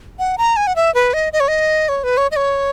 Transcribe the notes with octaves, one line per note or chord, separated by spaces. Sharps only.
F#5
A#5
G#5
F#5
E5
B4
D#5
D#5
C#5
D#5
C#5
B4
C#5
D#5
C#5